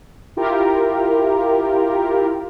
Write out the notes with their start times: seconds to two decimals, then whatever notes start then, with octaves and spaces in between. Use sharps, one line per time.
0.37 E4 F4 G4 A#4